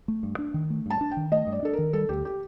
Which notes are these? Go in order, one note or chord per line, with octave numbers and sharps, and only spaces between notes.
A3
G2
D4
D#3
A3
G2 A5
D4
G5
D#3
A3 D#5
G2
D5
D4 A4
A#4
D#3
G3 A4
D2 G4
G4